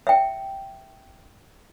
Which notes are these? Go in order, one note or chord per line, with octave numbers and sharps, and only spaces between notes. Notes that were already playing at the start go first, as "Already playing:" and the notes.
E5 G5